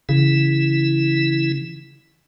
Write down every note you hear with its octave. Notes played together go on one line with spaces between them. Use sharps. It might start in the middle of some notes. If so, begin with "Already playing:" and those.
C#3 E3 E4